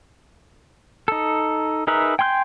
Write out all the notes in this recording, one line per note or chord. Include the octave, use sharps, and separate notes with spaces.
D#4 A4
D#4 G#4 A#4 B4 E5
G5 G#5 C6 F6 G6